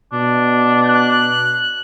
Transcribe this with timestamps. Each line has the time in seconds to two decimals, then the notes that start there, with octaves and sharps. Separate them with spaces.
0.13 B2 D4
0.86 F#6